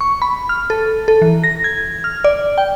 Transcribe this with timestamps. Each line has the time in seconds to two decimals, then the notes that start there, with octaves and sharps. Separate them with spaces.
0.01 C#6
0.22 B5
0.49 F6
0.70 A4
1.08 A4
1.22 E3
1.44 A#6
1.64 G#6
2.04 F6
2.24 D5
2.58 G5